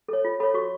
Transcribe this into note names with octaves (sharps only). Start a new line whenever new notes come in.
A4 C#5
F4
A4 C#5 B5
F#4 C#6